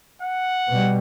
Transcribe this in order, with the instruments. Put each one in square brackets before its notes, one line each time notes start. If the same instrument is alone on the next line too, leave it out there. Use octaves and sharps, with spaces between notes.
[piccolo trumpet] F#5
[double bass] B2 G3